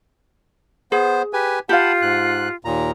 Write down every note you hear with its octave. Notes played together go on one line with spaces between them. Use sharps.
B3 G#4 C5
G4 B4 G#5
F4 G4 F5 F#5 A5 B5
G#2 F#6
D#2 A#2 A#5